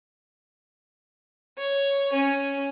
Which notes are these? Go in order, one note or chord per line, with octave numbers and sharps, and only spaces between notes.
C#5
C#4